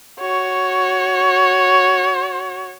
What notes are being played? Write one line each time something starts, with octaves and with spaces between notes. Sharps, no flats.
F#4 C#5